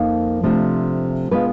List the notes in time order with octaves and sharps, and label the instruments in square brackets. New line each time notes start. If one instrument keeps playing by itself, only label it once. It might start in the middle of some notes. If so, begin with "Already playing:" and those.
Already playing: [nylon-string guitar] F2 F3 A#3 D#4
C3 F3 A3 D4
B2 G#3 B3 D4 F4 B4